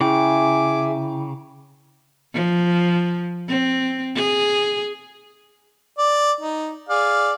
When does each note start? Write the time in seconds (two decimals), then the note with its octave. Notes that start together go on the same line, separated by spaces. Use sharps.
0.01 C#3 E4 G#4 E5 G5 G#5 D6
2.34 F3
3.49 C4
4.17 G#4
5.98 D5
6.41 D#4
6.89 G#4 D5 F5